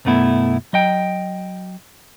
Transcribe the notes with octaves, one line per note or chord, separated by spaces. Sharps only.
B1 F#2 A3 B3 E4
F#3 D#5 G5